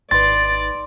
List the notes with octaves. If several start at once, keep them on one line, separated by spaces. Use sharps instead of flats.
G#1 D#4 B4 D5 C6 A6